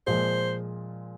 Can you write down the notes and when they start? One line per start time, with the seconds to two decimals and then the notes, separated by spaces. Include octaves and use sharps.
0.07 A#2 F3 G#3 C5